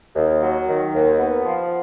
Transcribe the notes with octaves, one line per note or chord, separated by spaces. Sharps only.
D#2
F#3
D#3
D#2
B3
F3